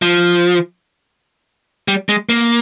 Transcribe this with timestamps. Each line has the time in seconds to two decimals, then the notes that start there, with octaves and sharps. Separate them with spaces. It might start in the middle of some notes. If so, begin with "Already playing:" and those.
0.02 F3
1.88 G3
2.09 G#3
2.29 A#3